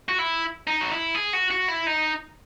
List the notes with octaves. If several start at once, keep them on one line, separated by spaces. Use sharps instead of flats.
F#4
E4
D#4
F#4
E4
G#4
F#4
F#4
E4
D#4